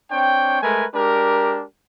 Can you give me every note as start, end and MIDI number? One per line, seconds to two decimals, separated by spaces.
0.10 0.61 60
0.10 0.61 62
0.10 0.61 73
0.10 0.61 79
0.61 0.85 56
0.61 0.85 57
0.61 0.85 70
0.61 0.85 71
0.61 0.85 80
0.95 1.64 56
0.95 1.64 62
0.95 1.64 67
0.95 1.64 70